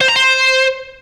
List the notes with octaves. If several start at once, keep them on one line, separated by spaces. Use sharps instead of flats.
C5
A#5
C5